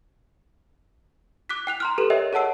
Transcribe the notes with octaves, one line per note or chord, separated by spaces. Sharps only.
D6 F#6 B6
G5 F#6 F7
A#5 C6 F6
G4 A4 B4 E7
A#4 C#5 D#5 E5 G5
G#4 C#5 F#5 A5 E6 C7